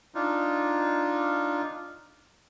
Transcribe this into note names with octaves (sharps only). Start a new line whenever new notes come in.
D4 D#4 F4